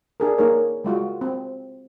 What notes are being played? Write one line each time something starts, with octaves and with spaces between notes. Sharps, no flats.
D4 G#4 A#4
A#3 D#4 G#4 A#4 C#5
G3 G#3 F4 F#4
C4